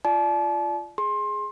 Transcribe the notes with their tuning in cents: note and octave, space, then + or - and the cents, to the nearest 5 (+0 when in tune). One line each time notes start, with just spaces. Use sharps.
F4 -20 D5 +0 A5 -35
G#4 +0 C6 +25